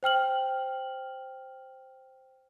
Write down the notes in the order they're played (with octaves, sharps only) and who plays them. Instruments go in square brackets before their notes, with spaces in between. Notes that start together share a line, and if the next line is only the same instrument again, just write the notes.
[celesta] C5 G5 F6 F#7